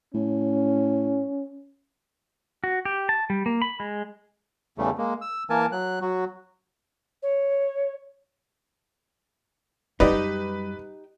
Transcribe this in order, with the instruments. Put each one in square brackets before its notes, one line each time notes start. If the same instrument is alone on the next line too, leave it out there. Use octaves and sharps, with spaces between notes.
[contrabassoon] A2 [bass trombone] C#4
[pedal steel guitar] F#4
G4
A5
G3
A#3
B5
G#3
[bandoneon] E2 C#3 E3 G3 A3
G#3 A#3
E6
E3 A#3 A#4 G#5 A5
F#3 F#6
F#3 F#4
[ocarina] C#5
[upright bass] F#2 G3 [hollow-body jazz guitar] D#4 G4 [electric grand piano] B4 [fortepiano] D5 D#5